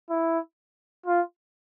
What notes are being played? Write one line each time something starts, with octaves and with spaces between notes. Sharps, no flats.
E4
F4